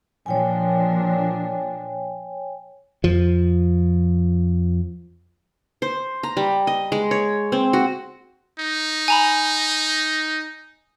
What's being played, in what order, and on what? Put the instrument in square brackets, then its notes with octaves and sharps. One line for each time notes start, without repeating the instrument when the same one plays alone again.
[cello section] A#2 F3 D4 [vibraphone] C#5 G5 G#5
[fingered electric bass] F2 F3
[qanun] C5
A#5
G3
D#5
G#3
C#5
C4
F#4
[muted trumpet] D#4
[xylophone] G#5 A#5 B5